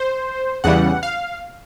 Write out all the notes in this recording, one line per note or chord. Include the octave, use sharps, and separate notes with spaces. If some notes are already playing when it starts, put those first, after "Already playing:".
Already playing: C5
E2 C#3 E3 G3 F#5
F5